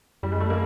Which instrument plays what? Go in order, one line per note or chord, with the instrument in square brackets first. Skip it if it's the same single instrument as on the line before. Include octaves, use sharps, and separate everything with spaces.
[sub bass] F#2 [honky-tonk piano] G3
[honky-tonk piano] G#3
A3
A#3